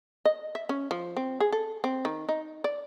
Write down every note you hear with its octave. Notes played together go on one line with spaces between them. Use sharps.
D#5
E5
C#4
F3
C4
G#4
A4
C4
D#3
D#4
D5